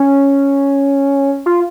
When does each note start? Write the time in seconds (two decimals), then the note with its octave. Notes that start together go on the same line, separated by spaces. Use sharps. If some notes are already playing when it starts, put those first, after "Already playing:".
Already playing: C#4
1.46 F4